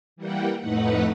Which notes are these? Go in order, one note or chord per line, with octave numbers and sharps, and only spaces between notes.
E3 G3 A#3 F#5 G5
F2 A2 A3 D#4 B4 F#5